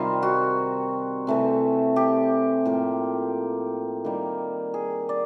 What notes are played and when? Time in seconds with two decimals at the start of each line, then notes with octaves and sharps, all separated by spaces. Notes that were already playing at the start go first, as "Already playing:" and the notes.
Already playing: C3 D#3 G3 C4 F4
0.23 F#4
1.27 C3 E3 A3 C4
1.96 G4
2.65 A2 F3 A#3
4.05 D#3 G3 A#3
4.74 G#4
5.09 D5